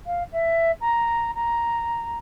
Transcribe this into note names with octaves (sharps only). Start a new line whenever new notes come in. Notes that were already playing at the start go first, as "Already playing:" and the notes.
F5
E5
A#5
A#5